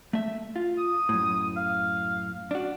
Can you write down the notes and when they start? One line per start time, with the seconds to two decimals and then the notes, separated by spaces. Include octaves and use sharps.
0.13 A3 E5
0.56 F4
0.78 D#6
1.09 F#2 A2
1.57 F5
2.51 D4 F#4